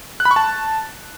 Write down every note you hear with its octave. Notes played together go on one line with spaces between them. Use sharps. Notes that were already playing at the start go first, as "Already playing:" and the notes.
F#6
B5
C#6
A5